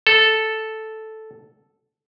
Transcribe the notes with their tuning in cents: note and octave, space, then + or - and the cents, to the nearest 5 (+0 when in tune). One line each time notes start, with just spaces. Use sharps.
A4 -5